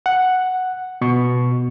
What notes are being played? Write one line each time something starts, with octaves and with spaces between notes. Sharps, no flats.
F#5
B2 C#6